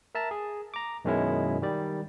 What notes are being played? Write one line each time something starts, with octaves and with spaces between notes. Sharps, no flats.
A#4 E5 A5 A#5
G#4
A#5 D6
F#2 B2 D#3 G#3 C#4 E4
D#3 G3 D5